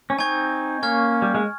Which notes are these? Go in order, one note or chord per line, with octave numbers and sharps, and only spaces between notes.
C#4
C4 D#4 G#5 C#6 G#6
A#3 C#4 C#6 F6 G#6
G3
G#3